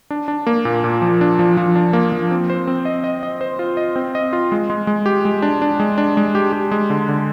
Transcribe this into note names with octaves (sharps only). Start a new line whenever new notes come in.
D4
D4
A#3
A#2
A#2
F3
D4
F3
F3
D4
A#3
F3
C4
C5
C4
D#5
D#5
D#5
C5
F4
D#5
C4
D#5
F4
G#3
G#3
G#3
G4
G#3
D4
D4
G#3
D4
G#3
G4
G4
G#3
D3
D3